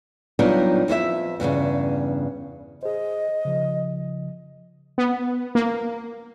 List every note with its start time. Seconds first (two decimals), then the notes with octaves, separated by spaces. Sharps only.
0.39 F#3 G3 B3 D4 D#4 F4
0.88 F2 E4 F4 E5
1.40 E2 G2 A#2 C#3
2.83 G#4 C5 D#5
3.45 C#3 F3
4.98 B3
5.55 A#3